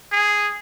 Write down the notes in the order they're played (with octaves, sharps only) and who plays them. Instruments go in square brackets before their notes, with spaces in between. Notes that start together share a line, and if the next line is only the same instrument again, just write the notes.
[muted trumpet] G#4